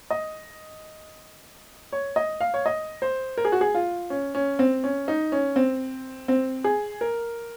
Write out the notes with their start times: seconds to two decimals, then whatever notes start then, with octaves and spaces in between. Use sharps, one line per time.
0.10 D#5
1.93 C#5
2.16 D#5
2.41 F5
2.54 C#5
2.66 D#5
3.02 C5
3.38 A#4
3.45 G#4
3.52 F#4
3.61 G#4
3.75 F4
4.10 C#4
4.35 C#4
4.59 C4
4.84 C#4
5.08 D#4
5.32 C#4
5.56 C4
6.28 C4
6.64 G#4
7.01 A#4